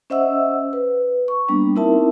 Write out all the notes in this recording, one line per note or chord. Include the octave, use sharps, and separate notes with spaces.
C#4 C5 D#5 E5 F#5 E6
B4
C#6
G3 A#3 B3 D4
C4 D#4 E4 A#4 E5 A5